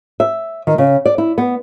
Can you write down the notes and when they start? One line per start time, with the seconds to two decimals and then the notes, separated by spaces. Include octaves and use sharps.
0.20 E5
0.67 D#3
0.78 C#3
1.05 D5
1.18 E4
1.38 B3